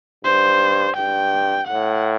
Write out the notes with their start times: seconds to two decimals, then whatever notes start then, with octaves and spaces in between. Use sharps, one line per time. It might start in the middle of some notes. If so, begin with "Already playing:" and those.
0.25 G2 C5
0.96 G2 G5
1.67 A2 F#5